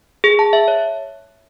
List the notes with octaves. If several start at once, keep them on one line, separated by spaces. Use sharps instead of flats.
G#4
A5
E5
C#5